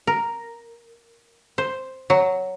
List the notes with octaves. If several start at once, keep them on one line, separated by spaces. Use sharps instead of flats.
A#4
C5
F#3